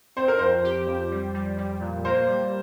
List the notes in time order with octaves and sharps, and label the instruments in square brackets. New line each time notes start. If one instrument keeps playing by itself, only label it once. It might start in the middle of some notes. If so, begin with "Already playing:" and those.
[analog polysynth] C4 [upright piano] C5
[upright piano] A#4
[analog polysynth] F2 [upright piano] C5
[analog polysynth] G4
F2
G3
G3
G3
A#2
[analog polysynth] A#3 [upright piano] C5
[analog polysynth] G3